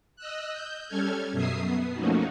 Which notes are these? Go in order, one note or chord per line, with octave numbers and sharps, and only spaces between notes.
D#5 E6 F#6
G6
G3 C#4 A4 F6 G#6
F#2 B2 F#3 E5 D#6 C7
B3
F3 A3 A#3 C#4 D#4 F#4